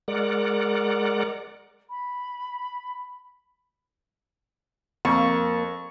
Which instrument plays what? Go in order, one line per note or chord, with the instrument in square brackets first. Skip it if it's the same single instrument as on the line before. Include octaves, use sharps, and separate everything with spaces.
[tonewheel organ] G#3 A#4 D5 F#5
[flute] B5
[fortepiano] F2 [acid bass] A#3 [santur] C#6